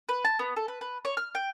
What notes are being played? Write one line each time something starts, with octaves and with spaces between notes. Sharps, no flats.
B4
A5
B3
A4
B4
B4
C#5
F6
G5